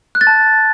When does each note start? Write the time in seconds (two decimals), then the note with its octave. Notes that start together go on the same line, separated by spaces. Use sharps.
0.15 F#6
0.21 A6
0.27 A5